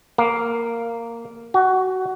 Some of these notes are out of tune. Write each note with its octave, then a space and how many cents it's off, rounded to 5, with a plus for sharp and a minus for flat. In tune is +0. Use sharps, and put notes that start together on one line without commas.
A#3 -5
F#4 +15